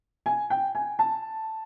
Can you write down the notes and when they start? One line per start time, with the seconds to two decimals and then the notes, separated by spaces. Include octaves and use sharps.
0.26 G#5
0.50 G5
0.75 G#5
0.99 A5